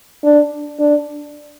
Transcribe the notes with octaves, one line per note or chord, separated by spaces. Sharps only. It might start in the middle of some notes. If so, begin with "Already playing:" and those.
D4
D4